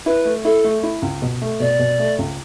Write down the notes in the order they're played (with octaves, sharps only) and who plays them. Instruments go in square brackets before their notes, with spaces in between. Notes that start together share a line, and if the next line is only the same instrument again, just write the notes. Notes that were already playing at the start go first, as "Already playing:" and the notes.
[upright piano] E4 [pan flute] B4
[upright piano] A3
[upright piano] E4 [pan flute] A4
[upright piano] A3
E4
C#2
B2
A3
[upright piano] B2 [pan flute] D5
[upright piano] B2
A3
C#2